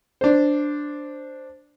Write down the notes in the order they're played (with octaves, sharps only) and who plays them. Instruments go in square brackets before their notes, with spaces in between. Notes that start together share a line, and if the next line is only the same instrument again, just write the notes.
[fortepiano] D4 C5